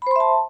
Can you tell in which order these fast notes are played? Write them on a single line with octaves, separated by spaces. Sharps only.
B5 C5 C6 E5 A5